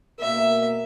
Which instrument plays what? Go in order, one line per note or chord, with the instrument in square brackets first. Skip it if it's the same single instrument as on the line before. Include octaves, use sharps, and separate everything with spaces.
[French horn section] B2 A#3 A#4 [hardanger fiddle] E5